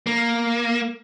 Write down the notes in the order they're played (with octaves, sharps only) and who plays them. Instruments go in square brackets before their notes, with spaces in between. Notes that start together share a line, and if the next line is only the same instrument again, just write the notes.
[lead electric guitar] A#3